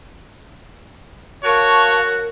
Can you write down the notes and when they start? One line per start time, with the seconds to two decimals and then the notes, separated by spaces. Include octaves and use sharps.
1.45 F#4 A#4 C#5 F5 A5 C#6